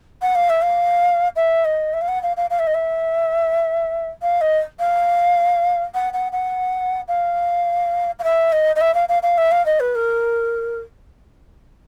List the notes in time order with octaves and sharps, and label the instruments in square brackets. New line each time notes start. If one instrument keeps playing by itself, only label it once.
[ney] F#5
F5
E5
F5
E5
D#5
E5
F5
F#5
F5
F5
F5
E5
D#5
E5
F5
D#5
F5
F#5
F#5
F#5
F5
F5
E5
D#5
D#5
E5
F5
F5
F5
E5
F5
D#5
B4
A#4